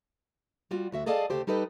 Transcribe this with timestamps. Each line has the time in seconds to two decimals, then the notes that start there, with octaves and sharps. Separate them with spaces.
0.71 G3 F4 F#4
0.92 D2 F#4 E5
1.06 G#4 A4 D5 D#5 F5 A5
1.30 D2 C#3 G4 A4 C5
1.47 G3 D#4 G4 A4 B4 D#5